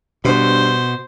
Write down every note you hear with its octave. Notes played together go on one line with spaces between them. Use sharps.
G2 B2 C5